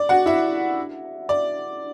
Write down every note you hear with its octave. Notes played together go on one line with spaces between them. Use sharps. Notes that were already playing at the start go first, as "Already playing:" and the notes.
Already playing: D5
F#4 F#5
E4 E5
D5